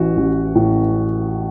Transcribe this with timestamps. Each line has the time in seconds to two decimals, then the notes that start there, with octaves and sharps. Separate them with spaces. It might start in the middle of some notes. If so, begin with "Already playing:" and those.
Already playing: A1 E3 F#4
0.17 A1
0.55 A2